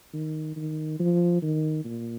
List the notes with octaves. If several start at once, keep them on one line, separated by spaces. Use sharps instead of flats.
D#3
D#3
F3
D#3
A#2